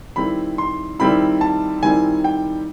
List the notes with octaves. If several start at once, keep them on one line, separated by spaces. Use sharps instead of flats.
D#3 G3 C4 E4 B5
C6
D#3 G3 C4 E4 B5
A5
D#3 G3 C4 E4 G#5
G5